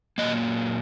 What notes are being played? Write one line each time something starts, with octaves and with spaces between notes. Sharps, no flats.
A#2 F#3 A#3 D#5